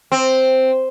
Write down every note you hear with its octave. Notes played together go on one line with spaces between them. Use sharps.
C4